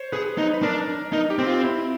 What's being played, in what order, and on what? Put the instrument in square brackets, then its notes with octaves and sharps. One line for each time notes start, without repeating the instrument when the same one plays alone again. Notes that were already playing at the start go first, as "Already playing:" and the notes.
Already playing: [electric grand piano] C5 C#5
[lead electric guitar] G#4 [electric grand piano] B4
[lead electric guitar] D#4
[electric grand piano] B4
[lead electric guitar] D4 [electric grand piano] A#4
[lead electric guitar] D#4 [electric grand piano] A#4
[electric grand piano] G4
[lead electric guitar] C4
[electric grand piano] F4
E4